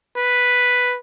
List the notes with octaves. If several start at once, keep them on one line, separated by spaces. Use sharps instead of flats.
B4